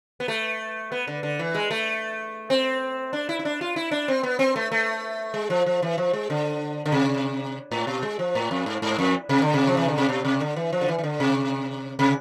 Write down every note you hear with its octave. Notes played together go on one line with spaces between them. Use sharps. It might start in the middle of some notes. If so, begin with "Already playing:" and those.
B3
A3
B3
D3
D3
E3
G#3
A3
C4
D4
E4
E4
D4
F4
E4
D4
C4
B3
C4
A3
A3
G#3
F3
F3
E3
F3
G#3
D3
D3
C3
A2
B2
G#3
F3
A2
F2
G#2
G#2
F2
C3
D3
C3
F3
E3
D3
C3
B2
C3
D3
E3
F3
D3
E3
E3
D3
C3
C3